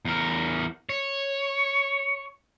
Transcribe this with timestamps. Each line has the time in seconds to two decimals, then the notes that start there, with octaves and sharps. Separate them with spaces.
0.05 E2 A#4
0.89 C#5